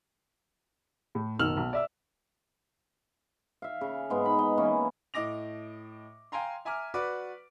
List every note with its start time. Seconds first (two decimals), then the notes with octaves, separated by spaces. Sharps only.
1.15 A2
1.39 F#1 B1 D#3 E6 F6 F#7
1.57 B1
1.73 D5 E5 E6
3.62 E5 F5
3.81 C#3
4.10 G#2 G#3 B3
4.24 D#4 B5
4.39 D#5
4.57 E3 A#3 C#4
5.14 A2 D#5 D6 A#6 F7
6.32 F5 G5 G#5 A#5 C6
6.65 E5 G#5 A#5 D6 F6
6.94 F#4 B4 D5 D6